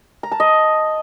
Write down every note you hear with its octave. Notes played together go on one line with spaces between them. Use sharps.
A#5
A5
D#5